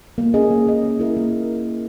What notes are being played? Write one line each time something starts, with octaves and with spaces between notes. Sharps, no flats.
A#3
C#4 G#4 D#5
A#3
C#4 G#4 D#5
A#3
E4 A#4 E5
A#3